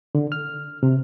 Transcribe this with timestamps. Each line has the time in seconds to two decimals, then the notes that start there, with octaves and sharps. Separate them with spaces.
0.15 D3
0.32 F6
0.83 C3